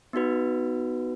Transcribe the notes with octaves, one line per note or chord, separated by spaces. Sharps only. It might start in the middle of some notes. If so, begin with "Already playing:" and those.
B3 D#4 F#4 B4